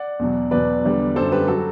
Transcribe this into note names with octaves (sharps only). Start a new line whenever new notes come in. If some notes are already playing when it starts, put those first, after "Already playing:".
Already playing: D5 F#5
E2 B2 F#3
E2 B2 F#3 B4 D5
E2 D3 G3
F#2 D3 G3 A4 C5
G4 B4
F#3 F#4 A4